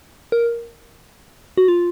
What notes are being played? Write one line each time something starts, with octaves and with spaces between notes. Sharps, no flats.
A#4
F#4
F4